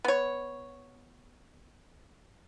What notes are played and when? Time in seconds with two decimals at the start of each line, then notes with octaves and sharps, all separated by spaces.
0.05 B3 C#5